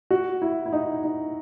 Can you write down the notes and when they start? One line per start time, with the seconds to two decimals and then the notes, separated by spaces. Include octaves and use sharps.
0.11 F#4
0.42 E4
0.66 E4
0.73 D#4
1.04 D#4